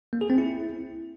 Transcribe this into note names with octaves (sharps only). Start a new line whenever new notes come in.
A#3
G#4
C4
E4